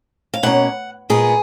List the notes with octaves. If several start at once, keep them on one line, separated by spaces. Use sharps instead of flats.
F5
B2 A#3 C#4 F#5
A#2 G#3 B3 G#4